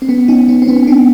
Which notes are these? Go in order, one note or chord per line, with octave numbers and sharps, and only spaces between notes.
C4
B3 C#4
C#4 D#4
B3 C#4
C4
B3 C#4
C4 D4